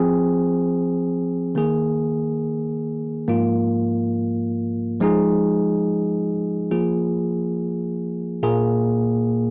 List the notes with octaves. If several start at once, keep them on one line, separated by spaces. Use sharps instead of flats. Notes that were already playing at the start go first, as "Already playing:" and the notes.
Already playing: F3 C4 G#4
D#3 A#3 G#4
G#2 F3 A#3 F4
F3 G#3 D#4 G#4
F3 A#3 F4 G#4
A#2 A#3 G#4